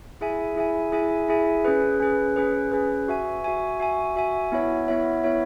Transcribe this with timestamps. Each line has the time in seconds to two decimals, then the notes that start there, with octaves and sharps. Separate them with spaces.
0.21 E4 G#4 E5 G#5
0.56 E4 G#4 E5 G#5
0.92 E4 G#4 E5 G#5
1.29 E4 G#4 E5 G#5
1.65 C#4 G#4 B4
2.00 C#4 G#4 B4
2.36 C#4 G#4 B4
2.72 C#4 G#4 B4
3.08 F#4 E5 G#5
3.44 F#4 E5 G#5
3.80 F#4 E5 G#5
4.16 F#4 E5 G#5
4.52 B3 E4 C#5 E5
4.88 B3 E4 C#5 E5
5.23 B3 E4 C#5 E5